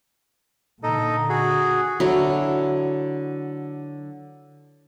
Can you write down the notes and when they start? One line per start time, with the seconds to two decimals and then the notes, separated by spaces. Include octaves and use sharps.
0.83 A#2 D3 D#4 A4 D#5
1.29 F#4 G#4
2.00 D3 F#3 E4